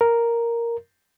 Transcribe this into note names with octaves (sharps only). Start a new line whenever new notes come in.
A#4